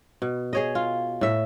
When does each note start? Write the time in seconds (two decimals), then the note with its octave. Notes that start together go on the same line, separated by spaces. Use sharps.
0.22 B2
0.53 G#4 C#5 D#5
0.75 F4
1.21 A2 E5